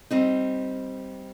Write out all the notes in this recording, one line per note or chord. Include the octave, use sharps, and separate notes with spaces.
G3 C4 D#4